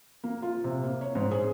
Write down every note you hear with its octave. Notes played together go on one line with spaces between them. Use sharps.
A#3
F4
C3
A#3
C#5
G#2
G#4